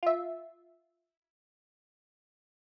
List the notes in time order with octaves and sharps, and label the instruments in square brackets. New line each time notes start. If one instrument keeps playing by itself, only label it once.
[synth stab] F4 E5